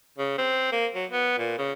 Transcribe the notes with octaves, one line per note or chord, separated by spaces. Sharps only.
C#3
C4
A#3
F#3
B3
A#2
C#3